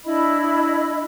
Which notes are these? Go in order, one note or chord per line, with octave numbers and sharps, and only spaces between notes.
D4 E4 D#5 B5